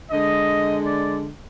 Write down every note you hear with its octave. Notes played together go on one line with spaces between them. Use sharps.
D3 G#3 D#5
D5